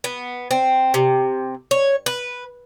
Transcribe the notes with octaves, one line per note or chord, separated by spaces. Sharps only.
B3
C4
C3
C#5
B4